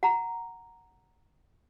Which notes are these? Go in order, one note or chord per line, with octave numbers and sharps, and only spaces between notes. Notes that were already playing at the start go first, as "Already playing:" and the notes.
F#5 A#5